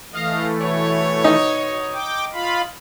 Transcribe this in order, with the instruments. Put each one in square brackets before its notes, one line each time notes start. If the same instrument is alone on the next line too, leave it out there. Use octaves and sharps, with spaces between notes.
[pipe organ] E3 A3 [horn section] D#5 F5
[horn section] B2 C#5
[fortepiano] D#4
[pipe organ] G5 D6
F4 F5 B5